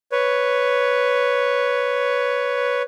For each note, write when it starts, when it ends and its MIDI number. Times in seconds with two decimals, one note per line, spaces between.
0.12 2.82 71
0.12 2.82 73